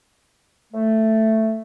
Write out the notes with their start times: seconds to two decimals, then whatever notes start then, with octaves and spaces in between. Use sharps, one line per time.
0.73 A3